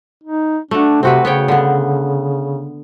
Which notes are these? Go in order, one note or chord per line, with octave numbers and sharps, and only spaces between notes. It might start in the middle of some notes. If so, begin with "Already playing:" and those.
D#4
A3 D4 F#4
C3 C4 F#4 B4
C#3 B3 C#5 G5
D3 B3